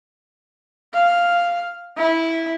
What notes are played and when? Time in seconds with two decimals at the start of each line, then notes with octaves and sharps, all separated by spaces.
0.94 F5
1.97 E4